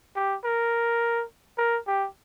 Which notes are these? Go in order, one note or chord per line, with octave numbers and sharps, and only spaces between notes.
G4
A#4
A#4
G4